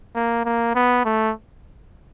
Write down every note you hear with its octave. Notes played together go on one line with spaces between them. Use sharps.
A#3
A#3
B3
A3